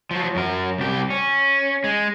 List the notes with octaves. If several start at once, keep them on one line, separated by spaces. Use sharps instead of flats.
F3 F#3
F#2 A#4
C2 G4
C#4
G#3